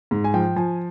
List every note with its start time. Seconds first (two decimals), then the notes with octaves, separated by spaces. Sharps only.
0.11 G#2
0.24 G#5
0.34 F3 G5
0.56 F3 G#5